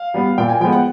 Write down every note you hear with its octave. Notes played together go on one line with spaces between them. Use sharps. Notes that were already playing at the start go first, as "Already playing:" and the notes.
Already playing: F5
G3 B3
A#2 G5
G#5
F3 G#3 B3 G5
F#5